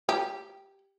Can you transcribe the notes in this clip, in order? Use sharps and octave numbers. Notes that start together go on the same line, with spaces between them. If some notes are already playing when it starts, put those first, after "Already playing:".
G4